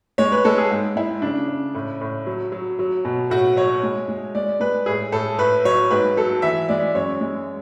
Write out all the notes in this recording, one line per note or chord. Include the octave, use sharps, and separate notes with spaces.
G#3 C#5
B4
G#3 A4
G#4
G#2
G#3 E4
C#3 D4
C#3
A2
A2
F#3
F#3
F#3
B2
A2 F#4
F#3 C#5
G#3
G#3
G#3 D5
G#3 B4
A2 G#4
A2 A4
A2 B4
F#3 C#5
G#2 B4
F#3 A4
E3 E5
G#3 D5
F#2 C#5
G#3